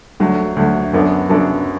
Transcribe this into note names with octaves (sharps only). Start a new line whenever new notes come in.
D2 D3 F#3 A3
D2 D3 F#3 A3
F#2 F#3 B3 D4 A4
F#2 F#3 B3 D4 A4